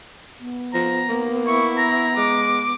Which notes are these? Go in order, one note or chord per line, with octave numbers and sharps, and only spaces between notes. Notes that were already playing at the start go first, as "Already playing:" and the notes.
B3
F3 A#5
A#3
E4 C#6
A#5
G#3 D6